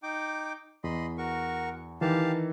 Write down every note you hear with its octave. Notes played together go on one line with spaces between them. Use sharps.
D#4 G5 D6
E2 D#5 B5 C6
F#4 A#4 C#6
D#3 E3 G4 F5 A5